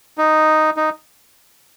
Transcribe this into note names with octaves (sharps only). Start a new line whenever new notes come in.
D#4
D#4